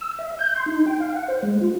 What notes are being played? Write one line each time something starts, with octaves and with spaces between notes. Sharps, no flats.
E6
E5
G6
C6
D#4
G5
F5
F#5
C5
G#3
F4